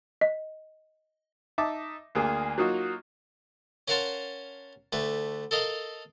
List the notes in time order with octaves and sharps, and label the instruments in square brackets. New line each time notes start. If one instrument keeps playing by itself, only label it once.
[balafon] D#5
[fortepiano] D#4 E5 A5 D6
D2 A#3 G#4
F#3 A#3 D#4 F4 F#4
[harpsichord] C#4 A#4 F5 F#5 A5 C6
D2 A3 B4
A4 A#4 D#5 F5